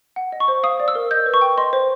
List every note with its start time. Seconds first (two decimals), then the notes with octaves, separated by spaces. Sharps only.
0.16 F#5
0.32 D#5
0.40 C#6
0.48 C5
0.63 F5 D#6
0.80 D5
0.88 E6
0.95 A#4
1.11 D#5 G6
1.26 B4
1.34 C#6
1.42 G5
1.58 D#5 C6
1.73 C5